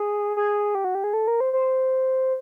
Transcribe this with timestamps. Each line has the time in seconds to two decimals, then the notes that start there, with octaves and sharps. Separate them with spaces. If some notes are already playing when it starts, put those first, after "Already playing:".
Already playing: G#4
0.37 G#4
0.75 G4
0.84 F#4
0.95 G4
1.04 G#4
1.13 A4
1.28 A#4
1.40 C5
1.53 C5